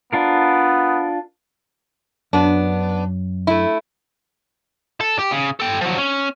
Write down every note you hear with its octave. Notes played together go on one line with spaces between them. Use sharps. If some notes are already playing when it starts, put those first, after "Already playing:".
B3 D4 F4 A#4
F#2 B3 D4
A3 E4
A4
G4
C#3
A4 G5
F3 F#3
C#4